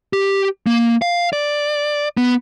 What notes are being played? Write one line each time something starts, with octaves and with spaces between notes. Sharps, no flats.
G4
A#3
F5
D5
B3